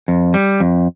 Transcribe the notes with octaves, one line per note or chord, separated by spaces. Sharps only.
F2
G3
F2